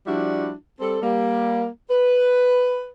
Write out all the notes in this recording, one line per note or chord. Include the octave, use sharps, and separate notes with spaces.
F3 G3 D4 E4 F#4
G3 C4 A4
G3 A#3
B4